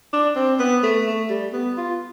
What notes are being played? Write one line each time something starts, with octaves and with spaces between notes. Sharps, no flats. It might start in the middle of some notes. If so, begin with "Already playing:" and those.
D4
C4
B3
A3
A3
G3
B3
F4